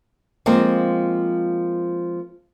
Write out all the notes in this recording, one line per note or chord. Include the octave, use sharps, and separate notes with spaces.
F3 G#3 A#3 C4